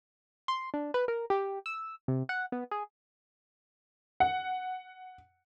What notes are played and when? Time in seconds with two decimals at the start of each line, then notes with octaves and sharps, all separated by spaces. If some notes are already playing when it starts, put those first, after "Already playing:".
0.48 C6
0.74 D4
0.94 B4
1.08 A#4
1.30 G4
1.66 E6
2.08 C3
2.29 F#5
2.52 B3
2.71 G#4
4.20 F#5